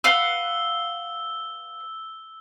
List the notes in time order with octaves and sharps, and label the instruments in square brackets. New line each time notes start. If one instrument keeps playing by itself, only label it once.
[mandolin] B4 F5 F#5 [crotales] E6 G7